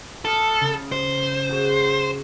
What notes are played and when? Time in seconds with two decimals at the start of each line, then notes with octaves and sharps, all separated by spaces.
0.25 A4 G#5 D#6 F6
0.60 C#3
0.92 C5
1.49 F#4 G#4 C#5